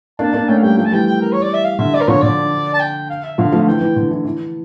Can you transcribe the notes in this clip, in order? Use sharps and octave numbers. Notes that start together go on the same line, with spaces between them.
A#3 D4 A5
A#3 D4
A3 C#4 G5
F5
G3 A#3 G5
F3 A3 G5
A5
E3 G3 G5
G5
A#4
C#5
D5
E5
F5
D3 E5
D5
A#4
D3 F3 C#5
D3 D5
A5
G5
F5
E5
D3 F3 F5
F3 A3
F5
E3 G5
E3
D3
E3
E3